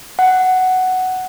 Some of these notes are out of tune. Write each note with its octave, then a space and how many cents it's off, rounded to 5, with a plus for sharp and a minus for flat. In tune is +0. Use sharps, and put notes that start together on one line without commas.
F#5 +5